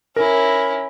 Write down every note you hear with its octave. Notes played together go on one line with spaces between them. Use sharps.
C#4 E4 A#4